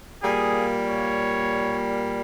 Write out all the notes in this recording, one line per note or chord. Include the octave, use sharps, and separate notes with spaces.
A#2 G3 A#3 G#4
C#5